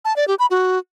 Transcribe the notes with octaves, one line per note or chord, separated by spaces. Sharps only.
A5
D5
G4
B5
F#4